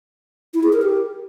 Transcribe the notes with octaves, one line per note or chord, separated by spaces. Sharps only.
E4
G#4
A#4
G4